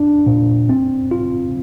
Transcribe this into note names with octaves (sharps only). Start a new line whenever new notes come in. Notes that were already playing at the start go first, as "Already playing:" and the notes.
Already playing: D4
A#2
C4
F4